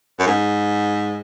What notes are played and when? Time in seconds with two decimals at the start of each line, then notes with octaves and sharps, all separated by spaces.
0.19 F#2
0.27 G#2